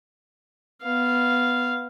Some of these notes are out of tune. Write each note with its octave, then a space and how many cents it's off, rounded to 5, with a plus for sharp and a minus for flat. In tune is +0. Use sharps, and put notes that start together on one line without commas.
B3 +0 F5 -10